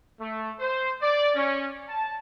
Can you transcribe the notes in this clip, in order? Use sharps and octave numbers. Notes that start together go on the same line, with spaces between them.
A3
C5
D5
C#4
A5